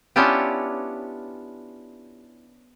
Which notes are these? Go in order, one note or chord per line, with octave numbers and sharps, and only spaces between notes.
B3 C#4 D4 E4 F4 G4